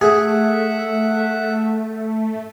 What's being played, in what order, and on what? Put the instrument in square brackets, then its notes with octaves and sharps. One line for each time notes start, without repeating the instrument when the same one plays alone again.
[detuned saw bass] A3 [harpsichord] G#4 [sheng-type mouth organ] E5 F#5